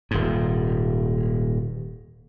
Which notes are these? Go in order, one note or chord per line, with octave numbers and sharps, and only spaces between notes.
D#1 G#2